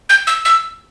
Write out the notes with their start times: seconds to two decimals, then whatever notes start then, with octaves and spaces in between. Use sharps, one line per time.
0.09 G6
0.27 E6
0.45 E6